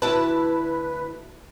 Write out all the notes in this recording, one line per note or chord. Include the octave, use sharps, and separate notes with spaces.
D2 E4 B4 A5